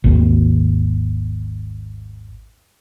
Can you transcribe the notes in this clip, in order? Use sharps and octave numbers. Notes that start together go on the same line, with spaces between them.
G#1 D#2